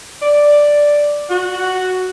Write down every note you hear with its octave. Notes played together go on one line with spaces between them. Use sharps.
D5
F#4